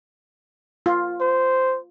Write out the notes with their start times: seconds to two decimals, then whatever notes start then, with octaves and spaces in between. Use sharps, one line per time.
0.86 F4
1.21 C5